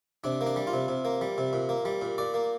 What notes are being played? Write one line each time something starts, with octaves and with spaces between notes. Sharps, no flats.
C3 D4
A#3
D4
G3
F4
C3
C3
A#3
G3
C3
A#2
A#3
G3
A#2
A#2 D5
A#3